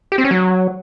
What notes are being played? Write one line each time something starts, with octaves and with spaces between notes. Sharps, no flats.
G4
C4
C#4
F#3